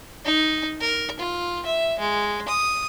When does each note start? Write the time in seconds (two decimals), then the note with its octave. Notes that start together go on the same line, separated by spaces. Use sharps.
0.25 D#4
0.81 A#4
1.19 F4
1.66 E5
1.99 G#3
2.49 D#6